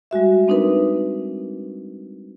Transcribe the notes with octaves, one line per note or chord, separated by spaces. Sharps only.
G3 G#3 F#4 E5
C4 D4 D#4 A#4 B4